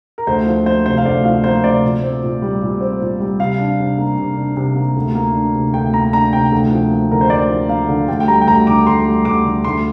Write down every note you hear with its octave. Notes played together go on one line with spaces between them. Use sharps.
A#4
D2 C5
F3
A#3 C5
C3 C5
F5
D2 D5
F3 F5
A#3 C5
C3 D5
A#2
C4
A#2
G3
A#2
C4
A#2
G3
C3 F5
D4
C3
A#3
C3
D4
C3
A#3
D2
A#3
D4
C3
D2 G5
A#3 A#5
D4 A#5
C3 G5
D2
F3
A#3
D3 A#4
C5
D2 D5
F3
A#3 F5
D3
D2 G5
G5
G3 A#5
G5
D2 A#5
D3 D6
D2 C6
G3
D2 D6
D3
D2 C6